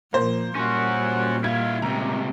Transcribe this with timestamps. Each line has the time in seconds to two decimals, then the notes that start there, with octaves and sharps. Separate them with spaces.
0.13 A#2 F3 A#3 C5
0.55 A#2 G3 C#4 F#4
1.44 E4 F5 G#6
1.82 C#2 C3 A#5